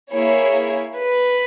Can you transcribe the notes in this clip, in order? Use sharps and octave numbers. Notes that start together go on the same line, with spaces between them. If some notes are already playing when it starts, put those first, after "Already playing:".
A#3 E4 G#4 C#5
B4